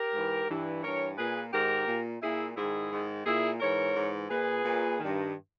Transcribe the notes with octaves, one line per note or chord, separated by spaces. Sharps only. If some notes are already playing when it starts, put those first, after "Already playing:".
Already playing: G4 A#4
G#2 E3
G2 E3
G2 E3 A#4 C#5
A#2 G#4 B4
G#2 D#3 G4 A#4
A#2
A#2 E4 G#4
G#2 D#3 E4 G#4
G#2 D#3
A#2 E4 G#4
G#2 E3 A#4 C#5
G#2 E3
A#2 G#4 B4
A#2
D#3
G2